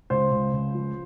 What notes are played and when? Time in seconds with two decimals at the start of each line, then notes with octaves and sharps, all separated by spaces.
0.10 C#2 C5
0.32 C#2
0.53 C#2
0.75 F3